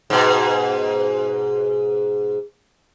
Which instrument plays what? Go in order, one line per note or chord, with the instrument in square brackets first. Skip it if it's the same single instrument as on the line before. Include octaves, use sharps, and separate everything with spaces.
[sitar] G#2 B2